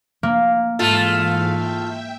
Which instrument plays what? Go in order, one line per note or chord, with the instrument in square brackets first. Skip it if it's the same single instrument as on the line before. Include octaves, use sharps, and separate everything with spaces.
[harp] A#3
[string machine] G#2 E3 F5 [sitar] A3 F4
[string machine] E5 G5